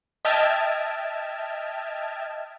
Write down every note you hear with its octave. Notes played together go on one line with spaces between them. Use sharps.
D#5 E5 G5 A5 F6 G#6